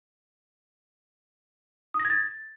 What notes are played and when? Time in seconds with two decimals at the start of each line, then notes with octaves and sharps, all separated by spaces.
1.94 D#6
2.00 A#6
2.05 G#6
2.10 A6